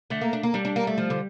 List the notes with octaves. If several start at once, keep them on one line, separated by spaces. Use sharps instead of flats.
D3 A3
A#3
D4
A#3
G3 D4
D4
A#3
A3
F3
D3